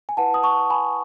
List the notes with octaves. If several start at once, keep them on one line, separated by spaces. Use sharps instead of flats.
G#5
E4 B4 F#5 A5
D#6
A5 C#6
G#5 B5